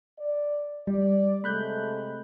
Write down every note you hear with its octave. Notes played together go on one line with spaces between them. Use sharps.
D5
G3 D5
C3 G#3 A3 B5 F#6 G6